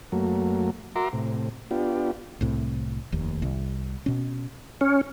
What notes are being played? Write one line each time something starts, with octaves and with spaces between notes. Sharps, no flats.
F#2 F#3 A3 A#3
F#4 A#4 E5 A#5 C6 D6
A2 C3
B3 D4 F4 G4
C2 A2 C3
F1 D#2
C2
B2 C#4
C#4